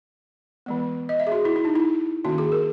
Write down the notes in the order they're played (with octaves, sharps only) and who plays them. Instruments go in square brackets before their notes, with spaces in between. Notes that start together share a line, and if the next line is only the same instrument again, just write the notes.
[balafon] E3 G#3 B3
D#5
E5
G#4
F#4
E4
E4
D#4
E4
D#3 A#3 C#4 F#4
G#4
A#4